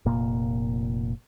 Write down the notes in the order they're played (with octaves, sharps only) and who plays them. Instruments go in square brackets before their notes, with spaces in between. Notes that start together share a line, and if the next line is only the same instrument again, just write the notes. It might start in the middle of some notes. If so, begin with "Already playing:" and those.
[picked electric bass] F1 A#2 A#3